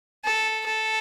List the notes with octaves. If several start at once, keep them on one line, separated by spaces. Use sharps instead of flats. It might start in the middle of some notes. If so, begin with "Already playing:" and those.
A4
A4